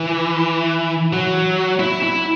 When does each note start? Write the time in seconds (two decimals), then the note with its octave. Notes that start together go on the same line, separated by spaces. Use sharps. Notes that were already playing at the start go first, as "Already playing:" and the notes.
Already playing: E3
1.13 F#3
1.79 E4
2.03 E4